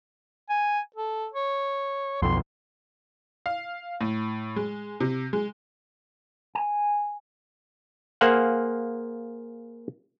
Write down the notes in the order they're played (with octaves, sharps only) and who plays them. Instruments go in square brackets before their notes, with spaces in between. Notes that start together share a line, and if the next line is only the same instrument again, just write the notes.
[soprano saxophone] G#5
A4
C#5
[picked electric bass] B1 F2 [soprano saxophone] C6
[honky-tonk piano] F5
A2
G#3
C3
G#3
[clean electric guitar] G#5
[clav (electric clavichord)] A#3 G#4 C5 F5 F#5 G#5